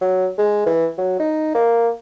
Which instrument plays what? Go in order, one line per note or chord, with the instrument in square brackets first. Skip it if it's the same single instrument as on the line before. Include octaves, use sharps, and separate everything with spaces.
[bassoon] F#3
G#3
E3
F#3
D#4
A#3